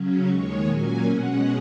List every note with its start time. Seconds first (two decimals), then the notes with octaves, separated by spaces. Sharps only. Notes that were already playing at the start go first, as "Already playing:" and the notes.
Already playing: C#3 F#3 C#4
0.27 D#2 D#3 G#3 C#5
0.66 A#2 F#3 A#3 C#4 G#5
1.05 B2 G#3 C#4 F#5